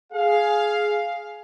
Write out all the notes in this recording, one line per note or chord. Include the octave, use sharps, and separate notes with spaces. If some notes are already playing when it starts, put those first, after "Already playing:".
G#4 F5